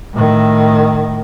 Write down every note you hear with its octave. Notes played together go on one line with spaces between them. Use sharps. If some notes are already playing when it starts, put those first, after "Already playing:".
A2 D#3